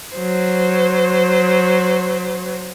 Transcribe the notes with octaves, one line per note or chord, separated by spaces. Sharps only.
F#3 C5